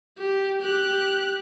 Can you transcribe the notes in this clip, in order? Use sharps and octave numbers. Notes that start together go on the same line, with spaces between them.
G4
G4 F#6